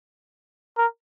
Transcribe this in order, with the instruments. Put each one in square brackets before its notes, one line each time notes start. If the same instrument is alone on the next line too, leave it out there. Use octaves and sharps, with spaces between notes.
[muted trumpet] A#4